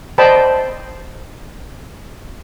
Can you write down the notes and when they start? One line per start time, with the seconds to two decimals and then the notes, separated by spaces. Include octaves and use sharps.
0.18 C5 D5 D#5 G5 A5 B5